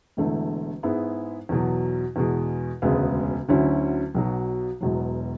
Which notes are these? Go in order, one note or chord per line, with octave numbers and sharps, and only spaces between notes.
E1 E2 D3 A3
G#2 G#3 B3 E4
E2 B2 F#3
E2 B2 G#3
E1 D2 C#3 G#3 B3
D2 D3 F#3 C#4 E4
B1 B2 F#3
E1 E2 B2 F#3